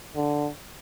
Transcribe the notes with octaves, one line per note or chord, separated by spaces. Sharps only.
D3